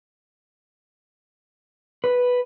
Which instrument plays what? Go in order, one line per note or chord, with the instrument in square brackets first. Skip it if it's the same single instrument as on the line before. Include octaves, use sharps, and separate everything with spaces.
[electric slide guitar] B4